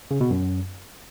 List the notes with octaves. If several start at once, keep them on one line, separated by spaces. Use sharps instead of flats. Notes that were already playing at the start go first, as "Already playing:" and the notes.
C#3
B2
F#2